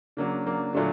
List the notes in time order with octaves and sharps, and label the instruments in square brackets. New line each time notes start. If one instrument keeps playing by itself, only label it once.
[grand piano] C#3 [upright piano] F#3 A#3 D4
[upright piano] F#3 A#3 D4
[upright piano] A#2 F#3 A3 D4 [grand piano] D3